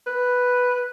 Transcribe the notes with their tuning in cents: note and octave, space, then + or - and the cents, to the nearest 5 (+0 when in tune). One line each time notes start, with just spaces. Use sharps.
B4 +0